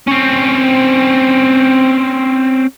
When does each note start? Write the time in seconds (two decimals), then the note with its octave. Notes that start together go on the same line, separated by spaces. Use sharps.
0.07 C4 C#4